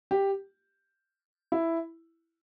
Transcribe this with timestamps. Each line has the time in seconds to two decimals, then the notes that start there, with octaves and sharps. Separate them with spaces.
0.11 G4
1.52 E4